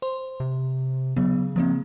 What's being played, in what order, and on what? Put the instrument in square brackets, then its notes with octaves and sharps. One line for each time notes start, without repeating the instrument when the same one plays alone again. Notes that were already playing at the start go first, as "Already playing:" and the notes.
[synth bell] C5 C6
[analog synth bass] C3
[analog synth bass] C#3 [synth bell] F#3 B3
[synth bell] F3 A#3 C4